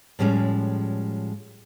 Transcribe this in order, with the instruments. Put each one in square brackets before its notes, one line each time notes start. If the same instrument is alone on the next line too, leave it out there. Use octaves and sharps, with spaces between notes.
[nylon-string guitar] A2 F3 G3 G#3 C#4